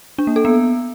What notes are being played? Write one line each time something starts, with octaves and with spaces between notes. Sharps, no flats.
D4
A#3
A4
B3